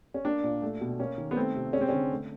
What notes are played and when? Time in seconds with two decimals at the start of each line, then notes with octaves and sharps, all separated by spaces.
0.14 C#4
0.25 A#3 D4
0.43 A#2
0.62 A3
0.81 B2
0.99 A#3 C#4
1.18 D#3
1.31 B3
1.36 A3 C4
1.55 C3
1.73 G#3 C#4
1.81 C4
1.89 D3 C#4
2.11 A3